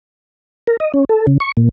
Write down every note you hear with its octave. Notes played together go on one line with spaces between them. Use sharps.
A#4
D#5
C#4
A4
C#3
C#6
A#2